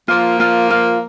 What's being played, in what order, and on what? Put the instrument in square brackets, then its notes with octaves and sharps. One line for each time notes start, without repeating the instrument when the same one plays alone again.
[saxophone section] F3 A#3 [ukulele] F4
[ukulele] F4
F4